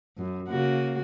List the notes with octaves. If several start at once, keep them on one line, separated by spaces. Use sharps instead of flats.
F#2
C#3 A#3 F#4